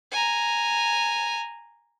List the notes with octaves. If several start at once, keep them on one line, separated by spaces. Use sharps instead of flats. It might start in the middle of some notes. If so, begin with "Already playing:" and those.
G#5 A#5